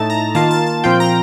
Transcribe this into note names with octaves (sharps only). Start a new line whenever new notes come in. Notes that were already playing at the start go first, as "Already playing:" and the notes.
Already playing: A2 A3 D#4 A5
A#5
D#3 A#3 F4 A5
A5
A5
A#2 F3 C4 F4 G5
A#5